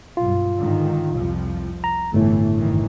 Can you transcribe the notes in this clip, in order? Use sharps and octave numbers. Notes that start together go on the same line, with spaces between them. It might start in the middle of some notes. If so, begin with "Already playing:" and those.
B1 G2 F4
G#2 D3 D#3
C2 F2 F3
A#5
G1 A2 E3 A3
F#1 D#3 E3